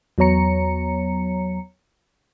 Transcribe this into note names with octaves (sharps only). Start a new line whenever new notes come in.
E2 F#3 B3 C#5 A#5 C#7